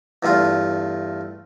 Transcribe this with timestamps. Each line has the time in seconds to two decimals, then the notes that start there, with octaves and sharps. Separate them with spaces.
0.23 E2 G2 A3 F4